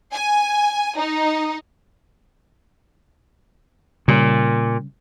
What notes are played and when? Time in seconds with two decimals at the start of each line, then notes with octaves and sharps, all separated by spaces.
0.13 G#5
0.97 D#4
4.08 A#2 C#3 G3 C#4